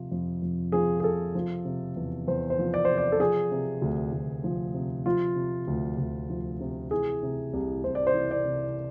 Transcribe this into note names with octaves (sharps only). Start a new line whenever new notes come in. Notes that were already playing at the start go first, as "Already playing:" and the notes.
Already playing: C3 F3
F2
F2
F3 G#4
G#4
C3 A4
F3
C3
E2
E2 C5
C5
F3
D5
C3 C5
D5
A4
F3 G#4
C3
D2
D2
F3
C3
F3 F4
C3
D2
D2
F3
C3
E3 G#4
C3
C2
C2 C5
D5
C5
E3
D5
C3